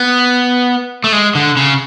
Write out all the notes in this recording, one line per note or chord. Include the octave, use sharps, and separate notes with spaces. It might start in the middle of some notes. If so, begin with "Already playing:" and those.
Already playing: B3
A3
G#3
D3
C#3